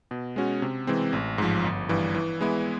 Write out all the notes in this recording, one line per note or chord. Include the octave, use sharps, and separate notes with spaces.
B2
G#3 C#4 F#4
C3
E3 G#3 C4
A1
G#2 F3
G1
G2 E3
E3
G#3 B3 E4